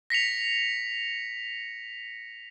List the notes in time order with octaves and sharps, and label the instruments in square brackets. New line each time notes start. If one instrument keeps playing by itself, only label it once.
[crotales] A#6 B6 C#7 F7